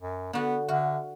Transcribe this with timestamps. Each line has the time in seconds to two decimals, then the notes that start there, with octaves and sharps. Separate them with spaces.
0.01 F#2
0.33 D3 B3 F#4
0.69 D3 F#4 E5 F#5 F6